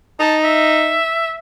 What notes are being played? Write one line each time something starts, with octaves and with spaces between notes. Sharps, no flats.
D#4 A5
E5